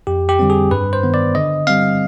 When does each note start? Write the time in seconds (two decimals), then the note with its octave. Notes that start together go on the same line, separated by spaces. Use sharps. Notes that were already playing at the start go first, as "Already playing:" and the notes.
0.07 F2 G4
0.29 G4
0.39 D3 G3 C4
0.50 G#4
0.71 G2 B4
0.93 C5
1.03 D#3 B3
1.14 D5
1.35 D3 D#5
1.67 G3 C4 F5